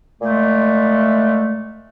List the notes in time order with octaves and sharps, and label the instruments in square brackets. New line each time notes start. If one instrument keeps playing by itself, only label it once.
[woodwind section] A#2 G#3 A3